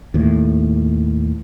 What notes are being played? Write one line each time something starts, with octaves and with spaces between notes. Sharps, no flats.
D#2 A2